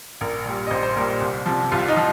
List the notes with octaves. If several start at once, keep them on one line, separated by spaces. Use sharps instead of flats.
A#1 A#4
A#2 G3
D#5
A#1 C5
C5
A#2 G3 A#4
C2
C3 F3
C2 F4
D#4
F3